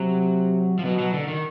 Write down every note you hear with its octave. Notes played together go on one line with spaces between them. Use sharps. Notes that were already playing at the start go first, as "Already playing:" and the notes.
Already playing: C3 F#3
F3
B2 F#3
F#3
D3
D#3